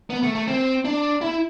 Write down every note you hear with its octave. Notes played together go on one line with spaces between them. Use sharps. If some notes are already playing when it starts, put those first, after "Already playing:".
B3
A3
A3
C4
D4
E4